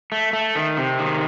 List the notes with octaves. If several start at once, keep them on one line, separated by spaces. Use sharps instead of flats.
A3
A3
D#3
C3
D#3